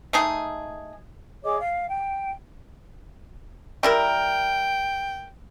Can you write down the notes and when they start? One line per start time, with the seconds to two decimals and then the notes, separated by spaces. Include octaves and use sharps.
0.13 A3 D#4 G#4
1.44 G#4 C#5 D#5 D6
1.60 F5
1.89 G5
3.83 G3 E4 A#4 G5